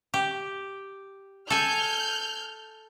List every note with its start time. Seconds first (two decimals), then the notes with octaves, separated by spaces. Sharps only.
0.14 G4
1.50 A4 G#5 F6 G6